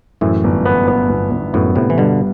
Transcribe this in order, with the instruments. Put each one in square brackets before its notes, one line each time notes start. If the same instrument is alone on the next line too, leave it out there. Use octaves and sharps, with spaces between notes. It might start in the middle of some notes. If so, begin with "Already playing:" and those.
[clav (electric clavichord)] F#2 A2 [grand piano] E3
[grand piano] G1
B3
B3
G1
G1
[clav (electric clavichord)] F#2 A2 [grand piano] B3
[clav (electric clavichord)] A2 C3 [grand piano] B3
[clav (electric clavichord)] E3
[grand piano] G2 [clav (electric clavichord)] B2 D3